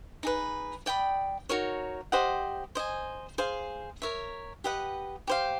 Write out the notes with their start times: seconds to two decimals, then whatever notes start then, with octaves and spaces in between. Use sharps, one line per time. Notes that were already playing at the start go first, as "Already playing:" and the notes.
0.23 D#4 G#4 B4
0.86 D5 G5 B5 D#6
1.49 D#4 F#4 A#4 C#5
2.12 G4 C5 D#5 F#5
2.75 C5 D#5 G#5
3.38 G#4 C5 F5
4.02 A#4 C#5 E5
4.64 G4 B4 D#5 F#5
5.27 G4 C5 F5